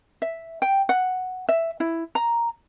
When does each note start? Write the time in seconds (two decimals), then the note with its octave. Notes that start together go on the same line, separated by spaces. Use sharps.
0.22 E5
0.62 G5
0.89 F#5
1.49 E5
1.80 E4
2.15 A#5